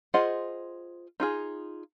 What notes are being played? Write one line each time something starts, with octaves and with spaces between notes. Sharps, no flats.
F4 G#4 C5 D#5 F#5
D#4 F4 G#4